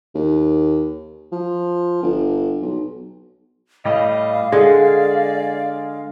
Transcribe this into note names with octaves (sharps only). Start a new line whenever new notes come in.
D#2
F3
G1
B1
A2 G3 D#5 F5
D3 G#3 G#4 D5